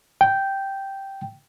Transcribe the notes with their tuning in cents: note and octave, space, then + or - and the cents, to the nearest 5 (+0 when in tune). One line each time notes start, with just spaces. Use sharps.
G5 -5